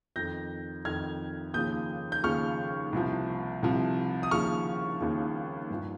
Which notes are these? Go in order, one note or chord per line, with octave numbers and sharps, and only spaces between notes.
F2 D#3 G6 A#6
F2 D#3 F6 G#6
D#2 C#3 F3 D#6 G6
G6
D#2 C#3 F3 C#6 F6
C2 C3 F3
C2 C3 F3
D#6
D#2 C#3 F3 C#6 F6
D#2 C#3 F3
G2 F3